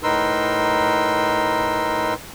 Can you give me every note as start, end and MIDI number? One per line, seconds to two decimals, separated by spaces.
0.03 2.14 45
0.03 2.14 63
0.03 2.14 70
0.03 2.14 71
0.03 2.14 84
0.03 2.14 88